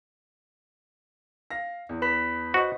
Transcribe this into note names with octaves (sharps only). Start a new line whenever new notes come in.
F5 A#6
E2
B4 B5 B6
F#4 C5 D#5